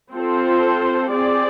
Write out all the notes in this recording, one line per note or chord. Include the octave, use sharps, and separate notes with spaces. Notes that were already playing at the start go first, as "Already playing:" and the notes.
C4 F4 A4 C5
C4 G#4 D5